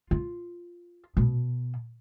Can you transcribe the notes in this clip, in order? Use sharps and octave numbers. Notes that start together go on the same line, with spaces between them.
F4
B2